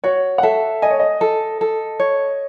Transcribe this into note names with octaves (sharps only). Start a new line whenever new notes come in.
F#4 C#5
F#5
A4 E5
D#5 G#5
C#5
D#5
A4
A4
C#5